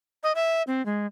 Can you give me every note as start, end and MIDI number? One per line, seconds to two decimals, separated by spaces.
0.23 0.32 75
0.35 0.62 76
0.67 0.84 60
0.86 1.06 56